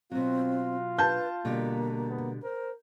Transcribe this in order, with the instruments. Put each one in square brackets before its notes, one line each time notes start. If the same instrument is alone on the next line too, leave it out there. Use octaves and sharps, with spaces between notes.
[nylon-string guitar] B2 F#3 [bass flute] C4 [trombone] F4
[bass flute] B4 [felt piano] A5 G6
[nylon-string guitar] B2 D3 G3 [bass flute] A#3
[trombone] B3
[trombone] A#4 [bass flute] C5